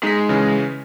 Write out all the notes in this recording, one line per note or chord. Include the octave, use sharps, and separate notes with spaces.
G#3 D#4 B6
C#3 E3 C#4